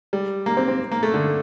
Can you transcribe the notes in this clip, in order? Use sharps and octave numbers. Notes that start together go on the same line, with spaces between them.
G3
A#3
C4
C4
A#3
A3
D3